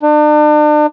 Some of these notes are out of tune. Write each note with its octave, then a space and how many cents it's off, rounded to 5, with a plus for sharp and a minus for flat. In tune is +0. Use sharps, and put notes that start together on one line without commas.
D4 +40